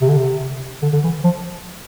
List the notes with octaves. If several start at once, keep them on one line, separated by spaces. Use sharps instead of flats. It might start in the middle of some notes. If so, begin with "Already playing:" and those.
C3
D3
C3
D3
D3
E3
F3